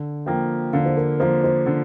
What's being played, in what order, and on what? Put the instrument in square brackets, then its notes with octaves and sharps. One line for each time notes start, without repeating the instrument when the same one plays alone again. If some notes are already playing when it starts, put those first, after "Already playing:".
Already playing: [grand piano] D3
[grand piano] F3 A#3 [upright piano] G5
[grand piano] D3 [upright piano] F5
[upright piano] C5
A#4
[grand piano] F3 A#3 [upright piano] C5
[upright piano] C5
[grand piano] D3